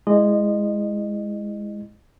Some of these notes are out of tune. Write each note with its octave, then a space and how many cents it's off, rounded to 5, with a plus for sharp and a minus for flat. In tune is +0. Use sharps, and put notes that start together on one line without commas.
G#3 +0 E4 +0 D#5 -25